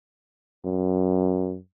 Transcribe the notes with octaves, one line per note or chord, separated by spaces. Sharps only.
F#2